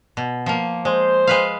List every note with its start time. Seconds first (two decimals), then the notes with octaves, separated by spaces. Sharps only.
0.17 B2
0.46 F3 A#3
0.85 G#3 C5
1.27 G#3 B4 F5